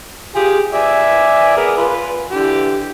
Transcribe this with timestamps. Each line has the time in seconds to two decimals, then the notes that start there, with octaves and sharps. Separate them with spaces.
0.35 F4 G4 G#4
0.73 D5 E5 G#5
1.57 B3 G#4 A#4
1.77 F4 B4
2.31 D3 E3 G4